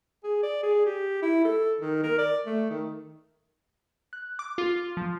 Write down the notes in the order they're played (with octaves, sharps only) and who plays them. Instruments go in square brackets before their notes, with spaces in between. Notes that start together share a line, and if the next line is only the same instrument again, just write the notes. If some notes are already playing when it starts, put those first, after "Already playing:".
[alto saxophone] G#4
D5
G#4
G4
E4
A4
D#3
A#4
D5
A3
D#3
[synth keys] F#6
D6
F4
F3